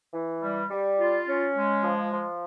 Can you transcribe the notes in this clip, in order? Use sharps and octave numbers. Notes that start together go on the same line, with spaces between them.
E3
G3
G3
F4
C#4
G#3
F3
F3